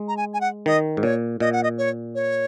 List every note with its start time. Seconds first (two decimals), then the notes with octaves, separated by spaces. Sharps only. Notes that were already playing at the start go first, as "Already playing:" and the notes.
Already playing: G#3
0.08 A#5
0.17 G#5
0.34 G#5
0.41 F#5
0.66 D#3 D#5
0.97 G#2
1.03 A#2 C#5
1.40 A#2 D#5
1.53 F#5
1.63 D#5
1.78 C#5
2.15 C#5